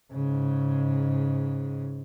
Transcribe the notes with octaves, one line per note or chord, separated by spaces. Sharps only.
G#2 C#3